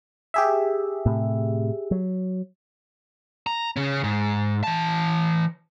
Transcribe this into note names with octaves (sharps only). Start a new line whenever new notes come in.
G4 G#4 E5
A2 C3
F#3
A#5
C#3 C#4
G#2
E3 A5